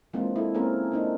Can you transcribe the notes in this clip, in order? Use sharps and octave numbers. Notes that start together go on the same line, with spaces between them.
E3 G#3 A#3 C4 D4 F4
E4 A4
A#3 C4 C#4 G#4 A#4
A#3 D4 D#4